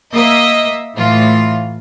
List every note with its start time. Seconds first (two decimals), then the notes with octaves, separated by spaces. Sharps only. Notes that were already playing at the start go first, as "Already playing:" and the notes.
0.14 A#3 D#5 E5
0.96 A2 E3 F4